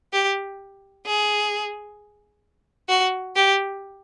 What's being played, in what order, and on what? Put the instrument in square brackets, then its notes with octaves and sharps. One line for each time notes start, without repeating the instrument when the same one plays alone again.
[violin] G4
G#4
F#4
G4